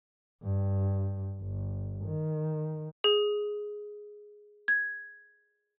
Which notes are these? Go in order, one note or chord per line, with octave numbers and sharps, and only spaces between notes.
G2
G1
D#3
G#4
G#6